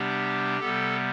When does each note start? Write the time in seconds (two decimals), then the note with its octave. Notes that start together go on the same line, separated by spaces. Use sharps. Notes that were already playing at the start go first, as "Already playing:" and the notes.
Already playing: C3 G3 B3 D4 G4
0.60 C3 G3 B3 A4